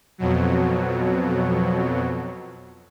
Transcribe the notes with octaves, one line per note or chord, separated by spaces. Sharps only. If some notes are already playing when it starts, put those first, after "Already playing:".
F2 B2 F#3